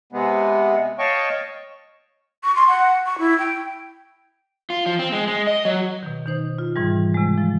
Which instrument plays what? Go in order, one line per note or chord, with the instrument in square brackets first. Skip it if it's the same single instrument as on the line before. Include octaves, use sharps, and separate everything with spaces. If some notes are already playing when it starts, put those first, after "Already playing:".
[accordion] C3 G#3 B3
C#5 D#5 F5 G5 A5 C#6
[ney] C#6
C6
F#5
C#6
E4
G5
[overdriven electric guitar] F4
F3
C4
G#3
G#3
D#5
F#3
[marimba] B2 D#3
D#3 D#4 C5
F4
G#2 E3 G3
C3 G#3
F3